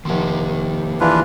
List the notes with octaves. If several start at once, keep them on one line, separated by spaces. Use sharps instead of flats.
F1 D#3 A#3 G4 C6
E3 D4 F4 G#4 B4 F5